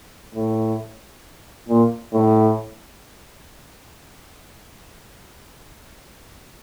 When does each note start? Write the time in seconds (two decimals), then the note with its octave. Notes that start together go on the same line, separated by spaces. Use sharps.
0.34 A2
1.69 A#2
2.13 A2